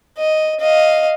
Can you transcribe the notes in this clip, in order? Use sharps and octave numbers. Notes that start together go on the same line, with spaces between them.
D#5
D#5 F5